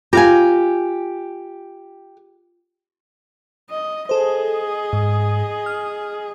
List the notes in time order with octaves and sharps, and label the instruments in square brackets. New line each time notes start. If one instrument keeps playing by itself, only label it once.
[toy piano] F4 [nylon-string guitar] G4 F5 G#5
[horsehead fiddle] D#5
[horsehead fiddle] G#4 D#5 [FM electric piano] A4 C5
[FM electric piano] G#2
F6